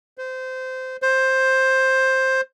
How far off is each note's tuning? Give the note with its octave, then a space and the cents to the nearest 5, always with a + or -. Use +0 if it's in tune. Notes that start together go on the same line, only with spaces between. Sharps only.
C5 -20
C5 +10